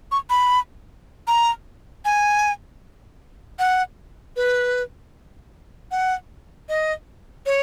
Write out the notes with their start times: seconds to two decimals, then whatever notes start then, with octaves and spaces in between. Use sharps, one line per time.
0.12 C#6
0.30 B5
1.28 A#5
2.05 G#5
3.59 F#5
4.36 B4
5.91 F#5
6.69 D#5
7.46 C#5